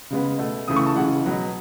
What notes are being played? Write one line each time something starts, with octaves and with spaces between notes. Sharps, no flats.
C#3 G#3 B3
B2 A3
C#3 E3 A3 D#6
C#6
A5
C#3 E3 G#3 F#5
B2 F#3 B3